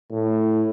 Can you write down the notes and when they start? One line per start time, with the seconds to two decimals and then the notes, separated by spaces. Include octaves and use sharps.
0.12 A2